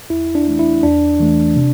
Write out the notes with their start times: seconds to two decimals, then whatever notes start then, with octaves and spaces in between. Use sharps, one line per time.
0.10 E2 E4
0.35 D4
0.47 E3 A3 D4
0.59 E4
0.83 E2 D4
1.20 E3 A3
1.56 C3